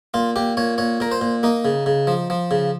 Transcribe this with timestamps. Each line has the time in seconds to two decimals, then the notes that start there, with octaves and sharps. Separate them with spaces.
0.14 A#2 F4
0.36 A#2 G4
0.57 A#2 C#5
0.78 A#2 C#5
1.00 A#2 A#4
1.11 C5
1.21 A#2
1.43 A#3 D#4
1.65 C#3
1.86 C#3
2.07 F3
2.30 F3
2.51 C#3